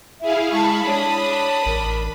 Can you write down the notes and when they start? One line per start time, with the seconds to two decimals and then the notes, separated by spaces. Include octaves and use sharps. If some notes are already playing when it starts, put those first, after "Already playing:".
0.21 E4 G#4 E5 F5
0.52 G#3 A5 B5 C#6
0.86 D4 C#5 A5 D#6
1.66 A1 A#4